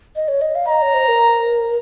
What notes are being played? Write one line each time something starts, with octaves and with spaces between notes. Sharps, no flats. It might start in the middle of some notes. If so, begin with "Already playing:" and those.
D#5
C#5
D#5
F5
D#5 A#5
C#5
C5
A#4